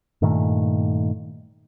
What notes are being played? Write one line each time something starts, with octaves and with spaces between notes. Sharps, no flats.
G2 A#2 D#3 A3